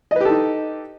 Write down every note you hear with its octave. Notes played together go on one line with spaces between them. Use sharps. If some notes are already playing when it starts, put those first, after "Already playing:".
D#4 G4 A4 B4 D#5